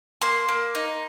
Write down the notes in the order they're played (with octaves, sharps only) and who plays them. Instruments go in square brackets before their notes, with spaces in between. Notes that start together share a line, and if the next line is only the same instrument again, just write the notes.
[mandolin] A#3 C6
A#3
D#4